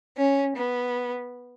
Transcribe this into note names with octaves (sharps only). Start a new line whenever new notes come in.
C#4
B3